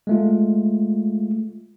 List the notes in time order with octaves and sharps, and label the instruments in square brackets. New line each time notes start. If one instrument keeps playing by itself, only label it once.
[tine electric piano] G#3 A3 F4